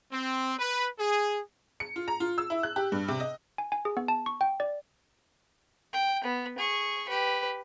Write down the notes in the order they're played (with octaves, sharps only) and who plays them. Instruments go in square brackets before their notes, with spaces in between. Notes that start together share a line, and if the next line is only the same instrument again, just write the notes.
[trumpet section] C4
B4
G#4
[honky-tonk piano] C#7
F4
A#5
F4
E6
E4
F#6
G4
G2
C3
D#5
[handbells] G#5
G#5
G#4
B3
A5
C#6
G5
D5
[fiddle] G5
B3
G#4 C#6
G4 B4